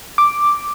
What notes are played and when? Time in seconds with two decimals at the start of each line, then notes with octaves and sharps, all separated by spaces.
0.18 D6